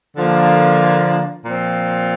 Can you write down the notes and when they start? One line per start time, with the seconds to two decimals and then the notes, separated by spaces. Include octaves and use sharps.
0.17 D3 F3 A#3
1.45 A#2 F3 C4